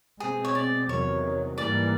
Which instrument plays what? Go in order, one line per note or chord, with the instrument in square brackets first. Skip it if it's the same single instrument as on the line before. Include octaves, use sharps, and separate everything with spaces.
[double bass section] B2 G#3 C4 [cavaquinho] G#4
[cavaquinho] C#5
D5
[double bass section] E2 C3 D#3 F#3 [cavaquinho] C#5
[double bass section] G#2 E3 G3 A#3 [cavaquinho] D5